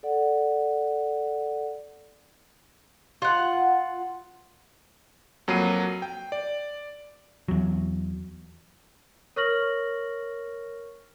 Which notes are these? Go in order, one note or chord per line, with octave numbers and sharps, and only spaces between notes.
A4 D5 F#5
F4 F#5
F2 F#3 A#3 C7 D#7
G5
D5
E2 F#3
A#4 C#5 C#6 F6 A#6 F#7